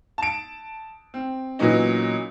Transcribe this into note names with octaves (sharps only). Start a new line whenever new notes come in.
A5 D7
C4
A#2 E3 F#3 B3 C#4 D#4